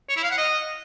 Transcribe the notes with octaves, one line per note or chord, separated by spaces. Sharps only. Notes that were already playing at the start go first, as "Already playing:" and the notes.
C#5
E4
F5
F#5
D#5